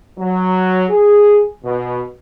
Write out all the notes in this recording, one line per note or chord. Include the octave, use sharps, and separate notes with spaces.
F#3
G#4
B2